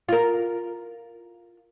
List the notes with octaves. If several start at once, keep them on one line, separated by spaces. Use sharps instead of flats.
F4 A#4